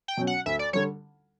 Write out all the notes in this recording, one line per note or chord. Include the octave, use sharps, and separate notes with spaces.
G5
B2 F#3 C#4
F#5
D2 E5
D5
D3 G3 C#5